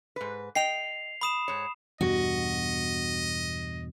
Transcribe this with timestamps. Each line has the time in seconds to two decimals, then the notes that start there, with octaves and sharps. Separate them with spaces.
0.16 G#2 B4
0.55 D#5 G5 C7 F7
1.21 B5 D#6 E7
1.48 G#2 C#5
2.01 E2 G2 B2 F#4 D#5